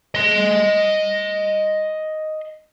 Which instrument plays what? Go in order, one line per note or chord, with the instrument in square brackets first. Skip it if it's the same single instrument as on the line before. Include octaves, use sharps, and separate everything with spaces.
[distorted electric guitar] D#5 C6